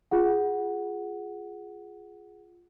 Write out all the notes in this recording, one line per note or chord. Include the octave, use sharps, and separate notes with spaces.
F4 G#4 F#5